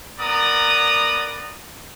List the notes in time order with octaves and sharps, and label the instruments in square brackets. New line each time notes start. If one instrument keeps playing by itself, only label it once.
[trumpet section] B3 A#4 D5 A#5 D#6